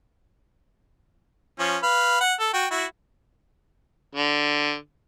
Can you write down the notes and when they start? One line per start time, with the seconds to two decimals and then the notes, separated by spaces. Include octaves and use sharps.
1.59 F3 C#4
1.83 B4 F5
2.21 F#5
2.40 A4
2.54 F#4 G5
2.71 E4 F#4
4.15 D3